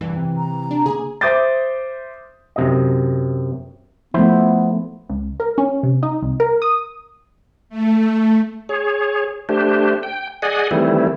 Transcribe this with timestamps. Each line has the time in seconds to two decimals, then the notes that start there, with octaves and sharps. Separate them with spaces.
0.01 F1 G2 E3
0.16 C3
0.37 A#5
0.71 D4
0.86 C#3 A#3 G#4
1.21 C5 E5 D6 D#6 G6 A6
2.56 F#2 C3 D#5
4.14 F3 A3 B3 E4 C5 E5
5.09 C#2
5.40 A#4
5.58 C#4
5.83 C3
6.03 D#4
6.22 C2
6.40 A#4
6.62 D#6
7.69 A3
8.69 G#4 C#5
9.49 A3 D4 G4 C5
10.03 G5
10.42 G#4 D5 D#5 F#5 G#5
10.71 D#3 E3 G3 A3 C4 E4